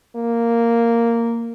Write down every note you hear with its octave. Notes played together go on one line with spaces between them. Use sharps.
A#3